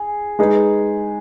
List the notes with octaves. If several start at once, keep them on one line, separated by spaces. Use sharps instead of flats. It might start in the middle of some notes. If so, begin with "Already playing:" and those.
Already playing: G#4
G#3 D#4 G#4 B4